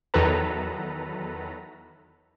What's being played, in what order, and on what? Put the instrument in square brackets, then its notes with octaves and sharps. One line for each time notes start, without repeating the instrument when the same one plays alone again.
[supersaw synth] E2 D#3 F#3 A4 B4 A#5